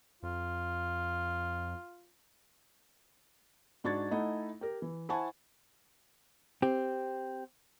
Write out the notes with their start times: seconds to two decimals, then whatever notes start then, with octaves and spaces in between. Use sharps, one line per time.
0.23 F2 F4
3.84 G#2 D4 F#4 C#6 G#6 A6
4.11 A3 D#4 E4 D#5 F#5
4.61 G4 A#4
4.82 E3
5.09 E4 C5 F#5 G#5 A5 C#6
6.62 C4 G4